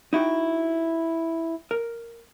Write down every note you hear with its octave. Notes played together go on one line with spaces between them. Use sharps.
D#4 E4 F#4 G5
A#4